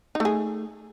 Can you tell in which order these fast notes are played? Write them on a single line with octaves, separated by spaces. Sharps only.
D#4 A3 G#4